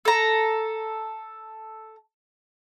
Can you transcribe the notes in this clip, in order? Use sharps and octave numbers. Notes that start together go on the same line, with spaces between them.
A4 A#5